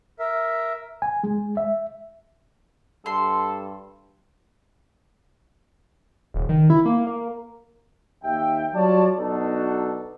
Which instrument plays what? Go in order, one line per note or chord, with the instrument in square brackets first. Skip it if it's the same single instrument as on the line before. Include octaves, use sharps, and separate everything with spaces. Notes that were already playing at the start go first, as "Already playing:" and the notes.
[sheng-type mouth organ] A#4 E5
[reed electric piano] G#5
G#3
E5
[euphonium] G2 [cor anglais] A4 [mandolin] C6
[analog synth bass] D#1
D#3
E4
A#3
A#3
[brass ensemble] D#2 E5 G5
F#3 G3 F4 C#5 D5 A5
B1 B3 D4 D#4 F#4 A4